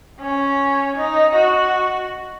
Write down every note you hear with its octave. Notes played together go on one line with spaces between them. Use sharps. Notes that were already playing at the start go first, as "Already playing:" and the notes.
C#4
D#4
F#4